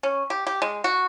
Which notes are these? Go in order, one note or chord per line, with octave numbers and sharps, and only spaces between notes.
C#4
G4
G4
G#3
F#4